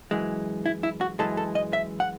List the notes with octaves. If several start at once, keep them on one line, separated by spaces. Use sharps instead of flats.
F#2 E3 G#3
E4
E4
F#4
F#2 E3 G#3 A4
A4
D#5
E5
F#5